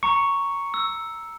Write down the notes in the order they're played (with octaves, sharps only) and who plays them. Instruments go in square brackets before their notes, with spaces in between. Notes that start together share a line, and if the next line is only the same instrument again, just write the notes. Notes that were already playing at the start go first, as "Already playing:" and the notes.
[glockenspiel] A#5 C#7 [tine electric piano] C#6
[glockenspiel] E6